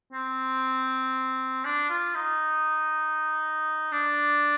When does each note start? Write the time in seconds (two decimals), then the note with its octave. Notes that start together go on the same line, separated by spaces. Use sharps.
0.13 C4
1.65 D4
1.89 F4
2.15 D#4
3.92 D4